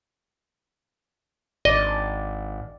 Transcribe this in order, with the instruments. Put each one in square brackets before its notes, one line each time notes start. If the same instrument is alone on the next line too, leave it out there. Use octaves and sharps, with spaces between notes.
[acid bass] G#1 [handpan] D5 [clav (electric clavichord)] D#5